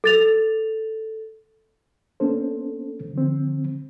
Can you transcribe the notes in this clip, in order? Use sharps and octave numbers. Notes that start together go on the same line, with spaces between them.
A4 A6 F7
A#3 B3 C#4 D4 A4 C5
D3 F3 C4